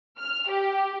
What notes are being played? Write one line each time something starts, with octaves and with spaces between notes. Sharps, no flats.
F6
G4